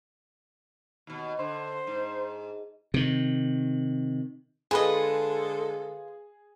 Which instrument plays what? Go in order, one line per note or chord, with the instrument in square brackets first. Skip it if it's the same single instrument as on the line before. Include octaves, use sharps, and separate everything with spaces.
[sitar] D#2 B2
[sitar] D3 [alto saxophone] C5
[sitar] G#2
[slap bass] C3 D#3
[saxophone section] D3 G#3 A4 [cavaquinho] F4 B4 D#5 [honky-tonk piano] G#4